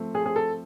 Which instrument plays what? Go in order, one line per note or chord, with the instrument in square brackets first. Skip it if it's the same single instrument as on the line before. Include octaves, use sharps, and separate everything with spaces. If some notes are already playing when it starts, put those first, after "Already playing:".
Already playing: [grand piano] F3 A3 C4
[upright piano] G#4
[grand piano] C4 [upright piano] G#4
[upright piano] A4